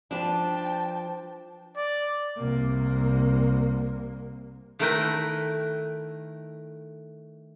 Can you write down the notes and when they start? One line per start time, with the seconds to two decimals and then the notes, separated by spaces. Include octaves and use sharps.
0.11 F3 D4 B4 G5 A5
1.77 D5
2.38 C2 A#3
4.79 D#3 A3 E4 A#4 B4 G5